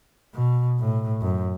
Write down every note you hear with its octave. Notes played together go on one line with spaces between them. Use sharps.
B2
A2
F#2